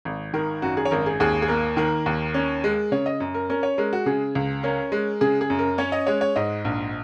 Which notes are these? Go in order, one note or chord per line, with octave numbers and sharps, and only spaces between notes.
G#1
D#3 A#4
F#2 F#4
G#4
C#5
G#1 A#4
G#4
D#2 G#4
G#4
A#3 A#4
D#3 A#4
D#2
C#4
G#3
C#3 C#5
D#5
F#2
A#4
C#4 A#4
C#5
G#3 A#4
F#4
C#3 G#4
C#2
C#4 A#4
G#3
C#3 G#4
G#4
F#2
A#4
C#4 C#5
D#5
G#3 C#5
C#5
G#2 D#5
A#1